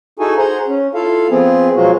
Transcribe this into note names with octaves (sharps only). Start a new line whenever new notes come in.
D#4 E4 F#4 G#4 A4 G#5
G#4 C5 F#5 A#5
C#4
E4 F4 A4 F5
F3 B3 C4 G#4
B2 F3 F#3 G#3 F4 F#4